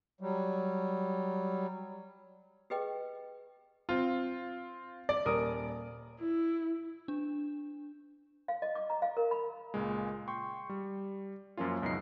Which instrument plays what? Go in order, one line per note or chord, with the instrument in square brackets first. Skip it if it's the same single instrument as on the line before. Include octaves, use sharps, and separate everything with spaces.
[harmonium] F#3 G3
[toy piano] G4 G#4 B4 D#5 G5
[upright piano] C4 F4
D5
D#1 A#4 D#6
[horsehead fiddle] E4
[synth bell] D4
[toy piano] F5
D#5
D6
A#5
F5
A#4
B5
[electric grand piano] C#2 A#2 G#3
G5 C6 C#6
G3
F#2 F3 A#3 C#4 F4
C#2 F#2 B2 D#4 C7